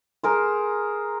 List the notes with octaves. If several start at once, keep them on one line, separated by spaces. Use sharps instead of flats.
G#4 A#4 C5